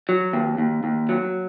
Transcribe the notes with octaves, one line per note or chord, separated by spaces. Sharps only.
F#3
D#2
D#2
D#2
F#3